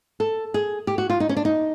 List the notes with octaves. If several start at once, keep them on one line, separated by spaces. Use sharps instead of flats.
A4
G#4
G4
F#4
F4
D#4
C#4
D4
D#4